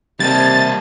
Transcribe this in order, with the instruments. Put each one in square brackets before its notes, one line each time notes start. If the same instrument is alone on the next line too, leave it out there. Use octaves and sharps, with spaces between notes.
[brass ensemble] C3 [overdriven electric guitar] G3 A#3 [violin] D#5 A5 [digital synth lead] A6